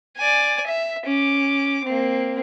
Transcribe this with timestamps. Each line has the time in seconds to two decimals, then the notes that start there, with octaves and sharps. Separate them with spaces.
0.17 D5 G#5
0.66 E5
1.06 C#4 D6
1.84 A#3 C4